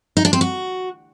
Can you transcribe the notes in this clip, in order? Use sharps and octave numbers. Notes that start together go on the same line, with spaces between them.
D#4
D4
C4
F#4